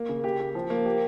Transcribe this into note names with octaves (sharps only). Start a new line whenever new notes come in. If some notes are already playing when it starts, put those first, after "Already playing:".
Already playing: A#3
C#3
G4
G4
F3
A#3
G4